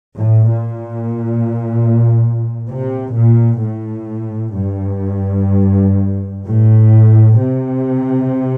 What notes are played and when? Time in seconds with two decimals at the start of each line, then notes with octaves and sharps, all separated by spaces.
0.16 A2
0.47 A#2
2.68 C3
3.14 A#2
3.61 A2
4.56 G2
6.45 A2
7.39 C3